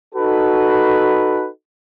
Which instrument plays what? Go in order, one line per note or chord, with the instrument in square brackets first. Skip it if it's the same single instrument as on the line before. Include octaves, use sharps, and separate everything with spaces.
[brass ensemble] D#4 F#4 A4 B4